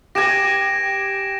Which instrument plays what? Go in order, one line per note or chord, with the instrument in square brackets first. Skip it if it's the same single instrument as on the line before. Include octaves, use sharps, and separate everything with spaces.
[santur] G4 G#5 [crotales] A#6 D7 E7